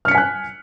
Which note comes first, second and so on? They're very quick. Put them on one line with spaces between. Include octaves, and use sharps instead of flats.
F6 C#7 B6 G#5 F#6